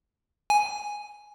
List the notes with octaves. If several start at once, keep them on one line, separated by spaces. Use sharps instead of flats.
G#5